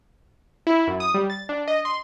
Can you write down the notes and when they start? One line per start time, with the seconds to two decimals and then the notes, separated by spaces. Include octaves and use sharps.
0.67 E4
0.87 F#2
1.00 D#6
1.14 G3
1.30 A6
1.49 D4
1.68 D#5
1.85 C6